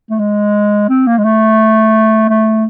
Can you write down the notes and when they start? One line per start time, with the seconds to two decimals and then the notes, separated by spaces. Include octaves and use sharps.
0.10 A3
0.19 G#3
0.89 C4
1.07 A#3
1.18 G#3
1.24 A3
2.29 A3